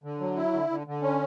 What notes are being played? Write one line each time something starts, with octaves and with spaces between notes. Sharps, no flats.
D3
F#3
E4
D3
D3
D3
C#4